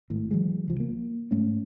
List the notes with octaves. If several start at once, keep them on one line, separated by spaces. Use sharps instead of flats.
G#1 A2
E3 F#3 G#3
C2 F3
A#3
G#2 A3 C#4